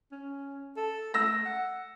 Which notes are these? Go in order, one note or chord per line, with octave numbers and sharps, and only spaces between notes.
C#4
A4
A3 E6 A#6
F#5